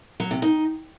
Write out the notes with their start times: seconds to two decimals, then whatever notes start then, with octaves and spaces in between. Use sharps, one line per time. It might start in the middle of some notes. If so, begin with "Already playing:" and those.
0.20 F#3
0.31 C3
0.42 D#4